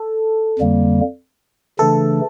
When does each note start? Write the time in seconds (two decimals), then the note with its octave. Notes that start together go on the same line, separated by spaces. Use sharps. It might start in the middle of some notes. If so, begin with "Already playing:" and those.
Already playing: A4
0.59 F2 D3 G3 A#3
1.79 C#3 E3 A3 D4 A4